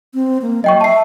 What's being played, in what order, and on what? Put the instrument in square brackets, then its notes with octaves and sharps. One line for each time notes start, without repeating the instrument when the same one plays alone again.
[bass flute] C4
A#3
[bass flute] F#3 [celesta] D#5 G5 C#6
[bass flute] E5 [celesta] A5 C7